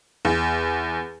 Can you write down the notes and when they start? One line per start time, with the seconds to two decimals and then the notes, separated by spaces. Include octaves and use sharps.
0.25 E2